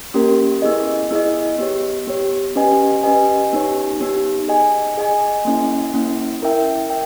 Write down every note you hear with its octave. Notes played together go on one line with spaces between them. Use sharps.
A#3 C#4 G4 A#4
B3 E4 G#4 D#5
B3 E4 G#4 D#5
B3 G4 C#5
B3 G4 C#5
C#4 G4 B4 D#5 G#5
C#4 G4 B4 D#5 G#5
B3 D#4 G4 C#5
B3 D#4 G4 C#5
G#4 D#5 G#5
G#4 D#5 G#5
A#3 C#4 E4
A#3 C#4 E4
E4 A#4 E5 G5
E5 G5